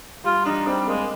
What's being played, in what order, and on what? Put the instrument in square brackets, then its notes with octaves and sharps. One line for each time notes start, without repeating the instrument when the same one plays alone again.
[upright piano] G3 [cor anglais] F4
[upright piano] D4 [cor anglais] D#4
[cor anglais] G3 [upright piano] C4
[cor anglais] G#3 [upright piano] A#3